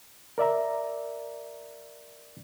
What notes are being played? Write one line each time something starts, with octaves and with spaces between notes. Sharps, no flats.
A#4 D5 E5 A#5